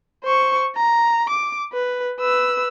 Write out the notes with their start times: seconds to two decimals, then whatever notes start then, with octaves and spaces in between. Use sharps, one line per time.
0.24 C5 C#6
0.76 A#5
1.30 D6
1.73 B4
2.20 B4 E6